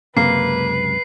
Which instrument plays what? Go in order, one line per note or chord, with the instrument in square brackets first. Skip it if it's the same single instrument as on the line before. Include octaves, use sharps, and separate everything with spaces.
[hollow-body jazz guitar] C#2 F#2 C3 [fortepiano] A#3 [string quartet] B4 [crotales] C7